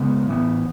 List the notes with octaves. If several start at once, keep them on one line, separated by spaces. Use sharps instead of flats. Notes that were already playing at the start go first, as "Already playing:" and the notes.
Already playing: C#3 G#3 B3
A2 E3 B3